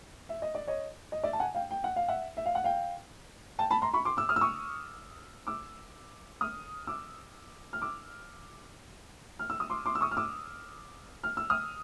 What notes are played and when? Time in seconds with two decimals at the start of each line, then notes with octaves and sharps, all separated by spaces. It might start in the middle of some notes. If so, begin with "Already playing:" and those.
0.29 E5
0.42 D#5
0.55 D5
0.67 C#5 D#5
1.12 D#5
1.24 D5 E5
1.33 A5
1.40 F#5 G#5
1.55 F5 G5
1.71 G5
1.84 F#5
1.96 F5
2.08 E5 F#5
2.37 E5
2.46 F5
2.55 F#5
2.64 F5 G5
3.59 G5 A5
3.70 A5 B5
3.82 A#5 C6
3.94 B5 C#6
4.05 C6 D6
4.17 D6 E6
4.29 D#6 F6
4.36 E6
4.41 C#6 D#6
5.47 D6 E6
6.41 D#6 F6
6.87 D6 E6
7.73 F6
7.82 D6 E6
9.39 F6
9.50 E6
9.60 D#6
9.70 C6 D6
9.86 C6 D6
9.95 E6
10.01 C#6 D#6
10.11 F6
10.17 D6 E6
11.23 F6
11.37 E6
11.50 D#6 F6